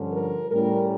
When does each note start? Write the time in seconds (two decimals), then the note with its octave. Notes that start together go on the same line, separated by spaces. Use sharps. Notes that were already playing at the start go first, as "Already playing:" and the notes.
Already playing: G2 D3 F3 C#4
0.13 A#4
0.52 A2 G3 C#4 A#4